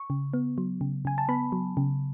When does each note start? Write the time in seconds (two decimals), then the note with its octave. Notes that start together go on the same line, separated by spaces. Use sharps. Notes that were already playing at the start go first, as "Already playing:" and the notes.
Already playing: C#6
0.10 C#3
0.34 B3
0.58 F#3
0.81 C#3
1.05 C#3 G#5
1.18 A5
1.29 B3 B5
1.52 F#3
1.77 C#3